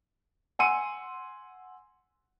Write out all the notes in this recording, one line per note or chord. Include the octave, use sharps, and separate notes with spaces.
F#5 G#5 C6 E6 C#7 D#7